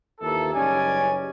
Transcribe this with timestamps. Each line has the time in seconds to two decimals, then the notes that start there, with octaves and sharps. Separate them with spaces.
0.21 D#2 E3 A#3 F4 A4
0.53 F#1 G3 C#4 D#4 D5 G#5